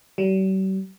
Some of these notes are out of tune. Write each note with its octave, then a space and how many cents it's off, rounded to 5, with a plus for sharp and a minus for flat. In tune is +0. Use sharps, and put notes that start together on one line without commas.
G3 -45